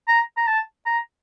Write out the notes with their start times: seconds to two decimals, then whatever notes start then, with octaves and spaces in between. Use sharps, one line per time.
0.08 A#5
0.37 A#5
0.47 A5
0.86 A#5